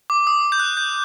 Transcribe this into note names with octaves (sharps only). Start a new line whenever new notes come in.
D6
D#6
G6
F#6
G6